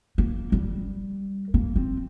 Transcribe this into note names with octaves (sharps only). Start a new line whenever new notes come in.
A#3
G3
A#3
C4